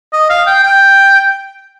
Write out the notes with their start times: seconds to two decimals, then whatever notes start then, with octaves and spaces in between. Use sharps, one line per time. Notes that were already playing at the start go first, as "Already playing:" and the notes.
0.13 D#5
0.30 F5
0.47 G5
0.63 G5